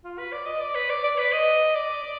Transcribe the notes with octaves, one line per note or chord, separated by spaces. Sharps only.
F4
B4
D5
D#5
D5
B4
D5
D5
B4
D#5
D5
D5